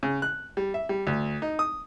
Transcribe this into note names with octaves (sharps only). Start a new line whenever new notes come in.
C#3
F#6
G3
E5
G3
D2
D#4
D#6